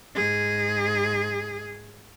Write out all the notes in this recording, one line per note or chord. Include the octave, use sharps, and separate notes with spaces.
G#2 G#4